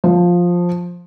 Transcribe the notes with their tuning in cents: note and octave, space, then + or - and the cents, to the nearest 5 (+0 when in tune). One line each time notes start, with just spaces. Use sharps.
F3 +10